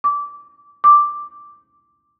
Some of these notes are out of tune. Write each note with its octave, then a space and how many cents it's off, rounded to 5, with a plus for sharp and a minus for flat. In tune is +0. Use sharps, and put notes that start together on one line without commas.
D6 -20
D6 +0